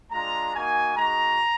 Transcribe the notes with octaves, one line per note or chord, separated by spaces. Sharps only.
G#3 D4 F4 A#5
A#3 D#4 F#4 G#5
G#3 D#4 F#4 A#5